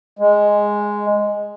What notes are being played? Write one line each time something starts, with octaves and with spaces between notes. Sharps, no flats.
G#3